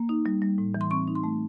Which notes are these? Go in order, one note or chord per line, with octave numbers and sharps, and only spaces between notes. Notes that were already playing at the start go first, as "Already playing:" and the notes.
Already playing: A#3
D#4
G3
G3
A2
E3
C6
C4 C#6
D#4
C6
A3